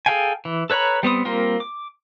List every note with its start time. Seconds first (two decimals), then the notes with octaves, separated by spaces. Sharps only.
0.06 G#4 A4 F5 G5 G#5
0.45 E3
0.70 A4 B4 C#5 A#5 B5
1.03 G3 B3 C4 D#6
1.25 G3 A#3 C4 F4 A#4
1.60 D6